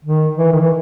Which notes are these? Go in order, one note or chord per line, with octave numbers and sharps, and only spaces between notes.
D#3
E3
D#3
E3